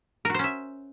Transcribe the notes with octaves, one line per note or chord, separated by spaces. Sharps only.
C#4 F#4 A#4 C5 E5